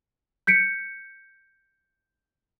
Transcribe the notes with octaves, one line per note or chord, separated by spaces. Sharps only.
G6 B6 C#7 D7